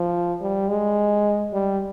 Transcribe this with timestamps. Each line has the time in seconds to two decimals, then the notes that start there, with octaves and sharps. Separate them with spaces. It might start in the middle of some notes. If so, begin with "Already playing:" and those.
Already playing: F3
0.41 G3
0.69 G#3
1.53 G3